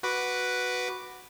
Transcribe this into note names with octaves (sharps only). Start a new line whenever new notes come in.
F#4 B4 D6